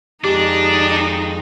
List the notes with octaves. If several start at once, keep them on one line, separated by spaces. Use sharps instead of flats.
F2 D#3 G#3 D4 D#4 G4